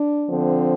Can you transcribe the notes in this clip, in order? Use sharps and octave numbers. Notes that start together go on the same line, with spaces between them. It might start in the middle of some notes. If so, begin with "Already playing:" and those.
Already playing: D4
D3 F3 C4